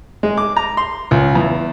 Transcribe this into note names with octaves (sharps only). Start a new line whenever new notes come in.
G#3
D6
A#5
C6
C#2
E2